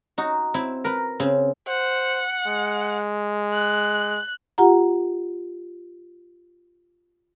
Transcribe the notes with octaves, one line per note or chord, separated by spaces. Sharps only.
D#4 F#4
C4 E4
A#4 B4
C#3 C4
C5 F#5
G#3
F#6
F4 G4 F#5 A#5